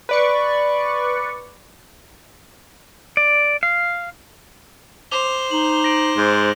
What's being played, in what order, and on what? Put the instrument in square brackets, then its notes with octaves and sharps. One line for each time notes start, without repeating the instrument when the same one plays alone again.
[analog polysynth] B4 D5 C#6
[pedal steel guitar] D5
F5
[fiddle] C5 [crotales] D6 F7 G7
[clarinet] D#4 [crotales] F#7
[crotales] A#6 D7
[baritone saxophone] G#2